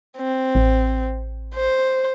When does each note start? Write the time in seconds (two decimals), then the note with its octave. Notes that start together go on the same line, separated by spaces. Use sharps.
0.18 C4
0.55 A1
1.55 C5